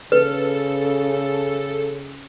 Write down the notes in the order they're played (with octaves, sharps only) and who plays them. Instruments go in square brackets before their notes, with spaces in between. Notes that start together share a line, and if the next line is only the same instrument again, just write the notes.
[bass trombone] C#3 [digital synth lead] A4 [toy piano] B4